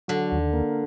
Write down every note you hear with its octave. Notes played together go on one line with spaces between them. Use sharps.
D3 F#3
D#2
A#3